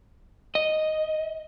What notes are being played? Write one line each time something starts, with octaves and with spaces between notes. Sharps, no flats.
D#5